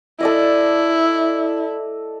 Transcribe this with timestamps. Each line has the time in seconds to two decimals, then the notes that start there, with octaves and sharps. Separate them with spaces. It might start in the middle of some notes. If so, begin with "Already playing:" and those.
0.20 E4 A4 D5 D#5